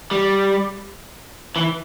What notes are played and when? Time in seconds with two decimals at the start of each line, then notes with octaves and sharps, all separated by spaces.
0.11 G3
1.56 E3